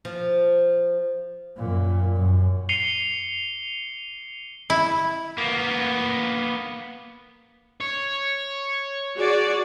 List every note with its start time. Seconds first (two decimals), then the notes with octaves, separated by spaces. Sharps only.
0.05 F3
1.56 F#2 A#2
2.16 F#2
2.69 C7 C#7 D#7 F7 G7
4.70 E4
5.38 A#3 B3
7.81 C#5
9.16 F#4 G#4 D5